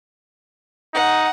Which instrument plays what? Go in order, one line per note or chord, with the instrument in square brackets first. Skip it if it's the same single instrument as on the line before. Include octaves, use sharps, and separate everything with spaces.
[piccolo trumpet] D#4 [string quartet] F#5